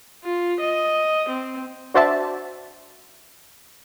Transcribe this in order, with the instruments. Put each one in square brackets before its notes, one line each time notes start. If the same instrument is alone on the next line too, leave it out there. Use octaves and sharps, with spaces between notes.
[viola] F4
D#5
C4
[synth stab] D4 F#4 C5 D5 E5 A5